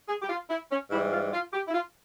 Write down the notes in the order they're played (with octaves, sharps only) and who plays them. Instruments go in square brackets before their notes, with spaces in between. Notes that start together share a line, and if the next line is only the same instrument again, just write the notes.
[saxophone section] G#4
G4
F4
E4
C#4
G#2 E3 G3 E4
F4
F4
G4
E4
F4